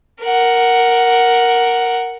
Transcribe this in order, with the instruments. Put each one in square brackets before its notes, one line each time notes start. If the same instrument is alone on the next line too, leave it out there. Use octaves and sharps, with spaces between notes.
[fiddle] A#4 F#5